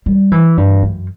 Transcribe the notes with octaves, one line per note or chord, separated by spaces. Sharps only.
G3
E3
G2
F#2